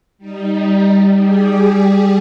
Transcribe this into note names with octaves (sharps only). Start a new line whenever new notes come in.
G3 D#4
G3 G4 G#4